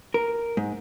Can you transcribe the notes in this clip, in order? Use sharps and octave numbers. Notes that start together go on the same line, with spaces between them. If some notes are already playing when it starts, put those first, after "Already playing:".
A#4
G#2